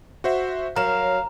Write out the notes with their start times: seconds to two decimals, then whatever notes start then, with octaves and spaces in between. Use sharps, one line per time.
0.24 F#4 C5 E5
0.76 F#3 A#4 F5 A#5 E7